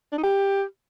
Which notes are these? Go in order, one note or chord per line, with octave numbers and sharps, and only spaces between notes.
D4
D#4
G4